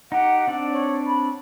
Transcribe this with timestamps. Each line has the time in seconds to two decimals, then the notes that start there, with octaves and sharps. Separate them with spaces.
0.12 D#4 G4 F#5
0.47 C4 D4 D5
0.71 C#5
1.07 B5